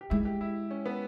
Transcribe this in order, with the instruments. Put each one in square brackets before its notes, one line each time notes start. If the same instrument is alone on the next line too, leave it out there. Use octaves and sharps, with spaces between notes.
[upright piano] G4
[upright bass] G#3 [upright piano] E4
[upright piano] G4
E4
C#4
B3